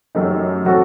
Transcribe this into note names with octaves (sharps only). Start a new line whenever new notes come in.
F#2 F#3 A3 D#4 G4
F#3 C4 F#4 A4